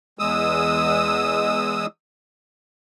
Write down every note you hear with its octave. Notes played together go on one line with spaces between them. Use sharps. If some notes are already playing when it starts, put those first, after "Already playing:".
E2 G#3 D#6 E6